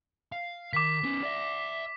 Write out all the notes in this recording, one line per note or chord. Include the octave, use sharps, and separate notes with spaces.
F5
D#3 D6 B6
B3 C#4
D5 E5